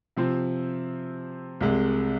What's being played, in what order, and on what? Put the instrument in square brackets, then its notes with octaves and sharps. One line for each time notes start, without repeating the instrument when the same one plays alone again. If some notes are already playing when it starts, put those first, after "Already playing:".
[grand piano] C3 F3 C4
C2 C3 G#3